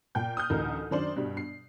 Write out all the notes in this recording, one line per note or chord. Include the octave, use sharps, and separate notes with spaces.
A#2 G5 G6
D#6 F6 G6
A1 D2 D#4 A#4
F#2 D#3 D4 C5 D5 F#7
G2 B2 G3
C7